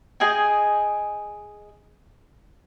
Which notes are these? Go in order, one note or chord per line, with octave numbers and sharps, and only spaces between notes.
G#4 D#5 G5 G#5